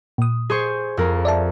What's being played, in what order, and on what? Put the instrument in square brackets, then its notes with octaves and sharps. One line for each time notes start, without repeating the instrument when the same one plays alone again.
[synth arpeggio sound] A#2 D#6
[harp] G#4 C5 C#6
F2 A#4
[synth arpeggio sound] D5 E5 A5